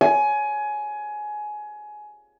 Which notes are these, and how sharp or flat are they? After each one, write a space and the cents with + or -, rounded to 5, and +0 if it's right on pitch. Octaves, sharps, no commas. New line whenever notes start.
G#5 +20